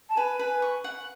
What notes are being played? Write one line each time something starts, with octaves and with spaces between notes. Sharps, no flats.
A5
B4 G#5
B4
C#6
F#5